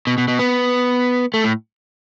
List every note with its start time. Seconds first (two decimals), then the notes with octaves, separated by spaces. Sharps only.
0.07 B2
0.18 B2
0.28 B2
0.39 B3
1.34 A3
1.44 A2